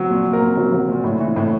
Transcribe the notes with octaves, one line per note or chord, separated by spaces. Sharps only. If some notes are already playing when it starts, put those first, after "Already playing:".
Already playing: F#3
A#2
A#2
A#4
A#2
F#3
F#3
A#2
A2
E3
A2